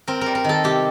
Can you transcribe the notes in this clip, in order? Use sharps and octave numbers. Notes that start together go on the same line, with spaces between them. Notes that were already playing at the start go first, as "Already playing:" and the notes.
C4 A#4
G3 A#4
A#4
D#3 A4
C3 G4